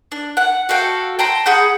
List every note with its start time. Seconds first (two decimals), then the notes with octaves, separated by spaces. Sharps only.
0.12 D4
0.37 F#5
0.69 F#4 A4 F5 G5
1.19 G5 A5 A#5 C6
1.46 G#4 F#5 B5 G6